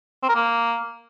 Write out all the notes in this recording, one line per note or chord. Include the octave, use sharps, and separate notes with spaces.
C4
A#4
A#3